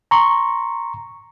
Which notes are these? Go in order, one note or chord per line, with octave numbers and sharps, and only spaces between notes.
A#5 C6 C#6